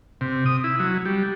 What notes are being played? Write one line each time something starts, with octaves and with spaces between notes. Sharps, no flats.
C3
D#6
E4
F#3
G3